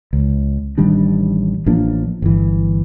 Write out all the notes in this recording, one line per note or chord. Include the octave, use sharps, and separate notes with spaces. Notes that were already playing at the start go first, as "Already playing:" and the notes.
C#2
A1 D#3 G3 D4
A1 F3 A#3 D4
G1 E3